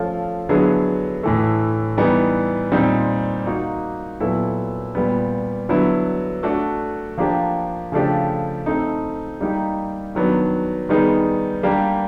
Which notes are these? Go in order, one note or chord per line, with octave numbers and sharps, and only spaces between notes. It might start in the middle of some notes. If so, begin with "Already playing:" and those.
Already playing: F3 A3 C#4 F4 A4
D3 F#3 B3 E4 G#4
A2 E3 A3
E3 G3 B3 D#4
A#2 G3 C4 D#4
A#3 D#4 F#4
A#2 F#3 B3 E4 A4
A#2 G3 B3
D3 F#3 B3 E4
A3 D4 F#4
F3 A#3 D4 G4
C#3 F3 A3 D4 G4
A3 C4 D#4
G3 A#3 D#4 G4
D#3 F#3 B3 D4
D#3 G3 B3 D#4 G#4
G3 A#3 D4 G4